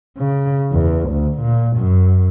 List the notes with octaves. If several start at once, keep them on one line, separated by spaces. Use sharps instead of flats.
C#3
E2
D2
A#2
F#2